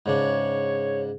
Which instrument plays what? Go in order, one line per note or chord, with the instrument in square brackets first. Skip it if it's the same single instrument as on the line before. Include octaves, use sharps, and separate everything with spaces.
[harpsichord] G#2 C#3 D4 [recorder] C#5